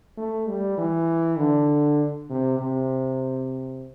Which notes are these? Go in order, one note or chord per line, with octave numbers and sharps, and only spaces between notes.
A3
G3
E3
D3
C3
C3